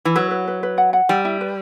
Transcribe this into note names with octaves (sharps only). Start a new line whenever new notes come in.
E3
F#3 B4
B4
B4
B4
F#5
F#5
G3 G5
E4
B4